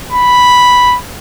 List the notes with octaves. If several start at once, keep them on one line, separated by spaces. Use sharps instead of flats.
B5